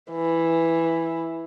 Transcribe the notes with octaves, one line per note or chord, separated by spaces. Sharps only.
E3